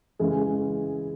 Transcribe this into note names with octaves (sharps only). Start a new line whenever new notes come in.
C#3 E3 G#3